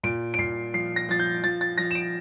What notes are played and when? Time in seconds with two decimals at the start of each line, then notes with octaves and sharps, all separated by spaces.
0.04 A#2 D7
0.34 D7
0.38 A#2 C7
0.74 F3 C7
0.96 A#6
1.09 F3 A6
1.20 G6
1.43 F3 A6
1.61 A6
1.78 F3 A#6
1.91 E7
1.95 D7